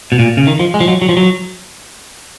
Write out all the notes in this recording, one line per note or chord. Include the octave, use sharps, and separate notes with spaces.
B2
A#2
C#3
D#3
F3
G#3
F3
F#3
F#3
F3
F#3